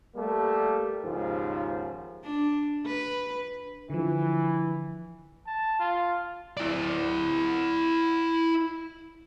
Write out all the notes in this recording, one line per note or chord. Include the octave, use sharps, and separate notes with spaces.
G3 A3 A#3
D#2 G#2 C#3 F3
D4
B4
D3 E3 F3
A5
F4
E4 D5